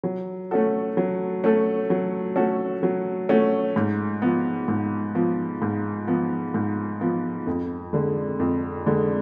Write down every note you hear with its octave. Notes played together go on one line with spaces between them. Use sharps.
F#3
A3 C#4 F#4 A4
F#3
A3 C#4 F#4 A4
F#3
A3 C#4 F#4 A4
F#3
A3 C#4 F#4 A4
G#2
F3 B3
G#2
F3 B3
G#2
F3 B3
G#2
F3 B3
F2
D3 G#3
F2
D3 G#3